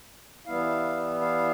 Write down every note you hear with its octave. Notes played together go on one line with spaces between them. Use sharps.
E3 G3 B3 E4 F5
F5